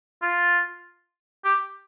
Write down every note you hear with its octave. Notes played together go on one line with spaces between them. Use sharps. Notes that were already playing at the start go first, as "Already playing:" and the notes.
F4
G4